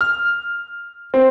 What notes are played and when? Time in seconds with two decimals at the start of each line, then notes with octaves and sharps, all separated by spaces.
0.01 F6
1.14 C4